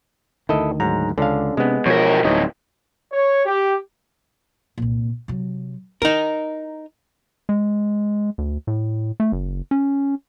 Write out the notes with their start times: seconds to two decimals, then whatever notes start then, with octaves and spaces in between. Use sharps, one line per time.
0.49 D2 D#3 E4 A4 D#5
0.80 G#2 F#3 A#5
1.18 C#2 D3 C#4 D4 F5
1.57 C3 G#3 B3
1.86 E2 B2 F3 A#4 C#5
2.24 D1 G2 E3 D#4 C#5 D#5
3.12 C#5
3.46 G4
4.78 C2 A#2
5.28 C3 F#3
6.02 D#4 E4 A#4
7.49 G#3
8.38 D2
8.67 A2
9.20 A3
9.32 F#1
9.71 C#4